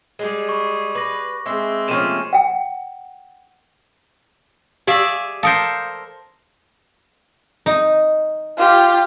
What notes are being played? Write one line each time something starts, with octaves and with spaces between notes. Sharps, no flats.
G3 G#3 G#4
B5 C#6
B4 D6 A#6
G#3 C4 E5
C3 F3 A3 A#3 C#4 D#7 E7
F#5 G5
G4 G#4 D5 E5 F5 E6
A4 A#4 C5 F5 D#6 C#7
D#4
F4 G4